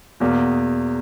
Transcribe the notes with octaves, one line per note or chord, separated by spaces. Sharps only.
E2 B2 A#3